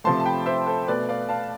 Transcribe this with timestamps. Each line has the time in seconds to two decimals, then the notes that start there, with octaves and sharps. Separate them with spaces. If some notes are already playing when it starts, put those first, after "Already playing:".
0.04 C3 F3 A3 A5 C6
0.20 A5
0.26 G5 B5
0.46 C5 E5
0.66 A4 C5
0.87 B2 A3 B4 D5
1.09 D5 F5
1.29 F5 A5